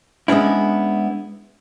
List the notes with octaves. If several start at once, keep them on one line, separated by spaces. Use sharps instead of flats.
G#3 B3 C#4 D4 E4